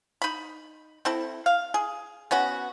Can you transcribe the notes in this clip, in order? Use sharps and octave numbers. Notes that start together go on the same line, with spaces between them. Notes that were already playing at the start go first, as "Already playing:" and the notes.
D#4 B5
C4 E4 A4
F5
G#4
B3 C#4 F#4